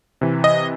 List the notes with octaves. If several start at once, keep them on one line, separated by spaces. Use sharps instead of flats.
C3 E3
D#5